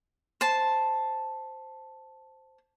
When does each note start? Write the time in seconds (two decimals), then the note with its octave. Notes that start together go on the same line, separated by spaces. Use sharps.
0.41 C5 A5